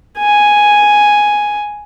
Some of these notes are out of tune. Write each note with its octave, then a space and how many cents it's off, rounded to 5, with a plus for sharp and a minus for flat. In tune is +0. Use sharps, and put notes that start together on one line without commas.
G#5 +0